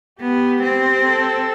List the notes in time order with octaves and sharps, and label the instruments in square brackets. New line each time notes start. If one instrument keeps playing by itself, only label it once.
[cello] B3 [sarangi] G4
[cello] C4
[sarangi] A4